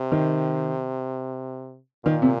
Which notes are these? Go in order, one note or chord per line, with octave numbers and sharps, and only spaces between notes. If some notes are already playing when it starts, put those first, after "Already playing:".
Already playing: C3
D#3
A#2 D#3
C3